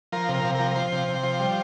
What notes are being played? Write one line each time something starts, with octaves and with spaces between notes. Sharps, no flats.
F3 A#4
C3
A#4
C3
F3 A#4
A#4
F3 C5
C3
C3
F3
G3